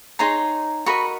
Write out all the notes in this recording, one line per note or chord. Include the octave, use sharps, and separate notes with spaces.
D#4 G#4 C#5 A#5 C6
F#4 A#4 D#5 B5 C#6